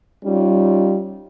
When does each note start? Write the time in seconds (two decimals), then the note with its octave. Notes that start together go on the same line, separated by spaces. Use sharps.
0.25 G3 C#4 D#4 F4